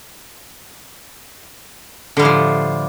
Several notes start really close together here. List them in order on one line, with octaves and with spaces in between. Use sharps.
D3 G3 A2 F3